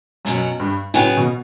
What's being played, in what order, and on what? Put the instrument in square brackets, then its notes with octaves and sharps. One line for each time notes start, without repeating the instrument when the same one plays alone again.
[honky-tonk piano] F#2 [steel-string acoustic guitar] B2 F#3 C#4 F#4
[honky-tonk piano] G2
[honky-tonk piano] A2 [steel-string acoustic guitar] C#3 F#3 B3
[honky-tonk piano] B2